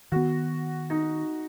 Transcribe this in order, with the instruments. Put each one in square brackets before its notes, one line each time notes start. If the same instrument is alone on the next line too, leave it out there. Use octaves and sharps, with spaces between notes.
[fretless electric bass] D#3 B3 [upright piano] F#4
[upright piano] D#4